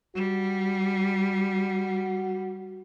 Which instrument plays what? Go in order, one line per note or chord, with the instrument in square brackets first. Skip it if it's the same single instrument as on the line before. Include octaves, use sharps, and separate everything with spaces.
[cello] G3 [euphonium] F#4